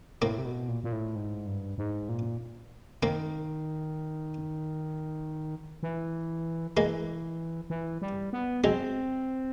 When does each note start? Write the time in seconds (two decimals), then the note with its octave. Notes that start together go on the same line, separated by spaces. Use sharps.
0.22 A2 A#3 C4
0.38 C3
0.45 B2
0.69 A#2
0.84 A#2
0.92 A2
1.16 G#2
1.47 G2
1.78 G#2
2.09 A#2
3.02 D#3 A#3 C4
5.83 E3
6.77 E3 G#3 A#3
7.70 E3
8.02 G3
8.33 B3
8.64 F#3 G#3 C4